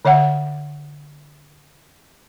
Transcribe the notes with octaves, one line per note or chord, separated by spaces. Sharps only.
D3 C#5 E5 F#5